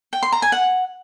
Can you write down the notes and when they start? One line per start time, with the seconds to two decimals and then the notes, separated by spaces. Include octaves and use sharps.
0.13 G5
0.23 C6
0.32 A#5
0.42 G#5
0.52 F#5